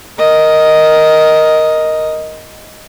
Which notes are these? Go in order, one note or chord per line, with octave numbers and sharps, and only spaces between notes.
A#4 D#5